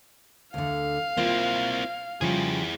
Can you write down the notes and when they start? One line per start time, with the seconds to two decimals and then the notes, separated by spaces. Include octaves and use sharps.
0.54 D2 D3 F5
1.17 A#3 C4 E4 F4
2.21 C#3 F3 G3 E4 G#4